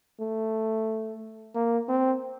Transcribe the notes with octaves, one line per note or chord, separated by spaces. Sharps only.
A3
A#3
C4